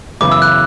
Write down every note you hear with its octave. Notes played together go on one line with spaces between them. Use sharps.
F#2 C#3 E3 B3 E4 D6
E6
F#6